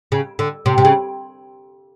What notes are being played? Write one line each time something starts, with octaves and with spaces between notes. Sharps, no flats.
C#3
D3
C3
C3
C#3